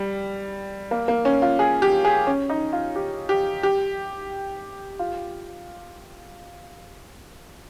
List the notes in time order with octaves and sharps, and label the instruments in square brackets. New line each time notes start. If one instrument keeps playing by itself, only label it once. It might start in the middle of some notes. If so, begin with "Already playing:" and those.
Already playing: [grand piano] G3
A#3
A#3
C#4
F4
G#4
G4
G#4
C#4
D#4
F4
G4
G4
G4
F4